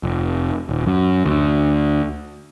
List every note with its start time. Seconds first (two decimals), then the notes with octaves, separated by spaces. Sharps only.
0.03 F1
0.69 D#1
0.86 F#2
1.25 D2